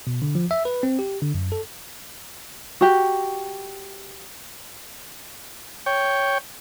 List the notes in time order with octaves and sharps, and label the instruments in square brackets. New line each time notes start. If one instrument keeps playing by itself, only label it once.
[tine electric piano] B2
D3
F3
E5
B4
C4
G4
D3
F#2
A4
[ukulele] F#4 G4
[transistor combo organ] C#5 G5